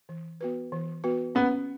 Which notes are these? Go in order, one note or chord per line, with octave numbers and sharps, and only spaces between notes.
E3
B3 F#4 B4
E3
B3 F#4 B4
B3 C#4